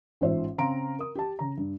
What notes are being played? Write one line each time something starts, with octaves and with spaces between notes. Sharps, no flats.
A1 G#2 F4 C5 E5
C#3 C4 F5 A#5 C6 D7
A#4 D#6
G4 A5
C#3 A#5
G2